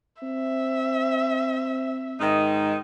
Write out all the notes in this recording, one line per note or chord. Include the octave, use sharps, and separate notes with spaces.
C4 E5
G#2 D#3 D#4